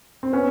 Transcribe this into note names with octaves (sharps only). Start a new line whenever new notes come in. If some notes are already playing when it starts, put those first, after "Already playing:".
C4
B3 C#4